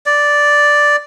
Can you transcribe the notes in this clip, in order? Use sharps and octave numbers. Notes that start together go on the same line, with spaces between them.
D5